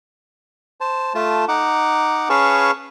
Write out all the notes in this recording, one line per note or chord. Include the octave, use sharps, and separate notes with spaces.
C5 A5
A3 F4 A5
D#4 F#5 D6
C#4 G#4 B4 F5 A5 C#6